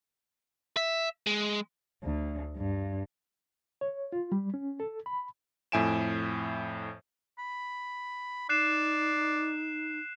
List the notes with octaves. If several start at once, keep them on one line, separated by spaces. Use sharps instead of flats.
E5
G#3
D2
G2
C#5
F4
G3
C#4
A4
B5
F2 A2 E5 G#5 D7 E7
B5
D#4 D5 F#6 C7 E7